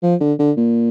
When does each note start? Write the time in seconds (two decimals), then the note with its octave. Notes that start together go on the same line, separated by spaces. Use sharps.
0.03 F3
0.21 D3
0.39 D3
0.57 A#2